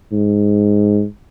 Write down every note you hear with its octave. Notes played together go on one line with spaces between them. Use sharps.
G#2